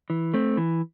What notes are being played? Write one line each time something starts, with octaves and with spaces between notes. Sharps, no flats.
E3
A3 C4
E3